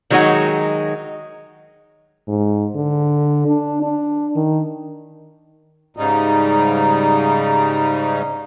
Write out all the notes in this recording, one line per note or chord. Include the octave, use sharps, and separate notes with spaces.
D#3 F#3 G#3 D#4 F#4
G#2
D3
D4
D4
D#3
G#2 C#3 G3 D#4